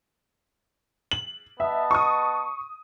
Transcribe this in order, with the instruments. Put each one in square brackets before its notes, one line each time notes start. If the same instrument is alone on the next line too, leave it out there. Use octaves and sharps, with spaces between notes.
[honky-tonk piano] F#7
[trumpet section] B3 D#5 A5 [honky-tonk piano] E5
[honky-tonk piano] C#6 D#6